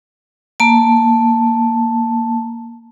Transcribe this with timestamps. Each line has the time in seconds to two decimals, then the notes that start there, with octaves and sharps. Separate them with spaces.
0.60 A#3 A5